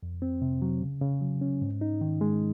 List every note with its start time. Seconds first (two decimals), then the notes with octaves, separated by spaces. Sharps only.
0.03 F2
0.22 C4
0.42 C3
0.62 F#3
0.82 C#3
1.01 C#3
1.21 F#3
1.41 C#4
1.62 G#2
1.81 D#4
2.01 D#3
2.21 G#3